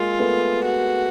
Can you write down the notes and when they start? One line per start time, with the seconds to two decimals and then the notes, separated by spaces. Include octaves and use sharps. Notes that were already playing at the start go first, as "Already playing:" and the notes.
Already playing: G#3 A#3 F4
0.19 A3 B3
0.65 F#4